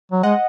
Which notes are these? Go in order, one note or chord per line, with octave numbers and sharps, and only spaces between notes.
F#3
G#3 D#5 F#5